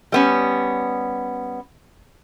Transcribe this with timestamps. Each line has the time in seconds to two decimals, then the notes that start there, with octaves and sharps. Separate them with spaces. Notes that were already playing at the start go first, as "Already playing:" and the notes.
0.12 G3 B3 C#4